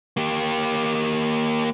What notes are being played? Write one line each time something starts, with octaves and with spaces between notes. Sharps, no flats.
A#3 G4